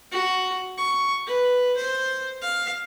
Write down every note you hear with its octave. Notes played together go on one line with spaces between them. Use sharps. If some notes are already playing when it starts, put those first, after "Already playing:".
F#4
C#6
B4
C5
F5